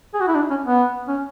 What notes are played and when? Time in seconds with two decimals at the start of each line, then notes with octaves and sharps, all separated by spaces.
0.14 G#4
0.20 F#4
0.28 E4
0.35 D4
0.50 C#4
0.66 B3
1.08 C#4